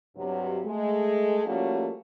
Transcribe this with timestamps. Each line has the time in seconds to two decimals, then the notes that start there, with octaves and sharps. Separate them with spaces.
0.15 G2 C3 F#3
0.65 G#3 A3
1.45 F3 G3 A3 A#3 C#4 F#4